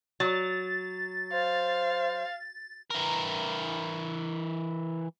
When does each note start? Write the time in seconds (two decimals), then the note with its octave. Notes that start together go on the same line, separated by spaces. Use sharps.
0.20 F#3 A6
1.33 C5 F5
2.91 E3 A#4